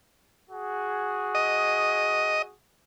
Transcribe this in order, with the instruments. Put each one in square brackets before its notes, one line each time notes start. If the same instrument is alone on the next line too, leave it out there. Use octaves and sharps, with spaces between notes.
[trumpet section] F#4 G#4
[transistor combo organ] D#5